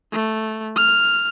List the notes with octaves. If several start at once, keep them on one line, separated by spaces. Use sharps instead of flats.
A3
F6